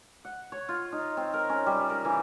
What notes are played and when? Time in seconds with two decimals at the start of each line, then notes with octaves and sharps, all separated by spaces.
0.25 F#5
0.52 C#5
0.69 F4
0.92 D#4
1.17 C4
1.34 A#4
1.49 C#4
1.66 G3
1.90 A#4
2.05 E3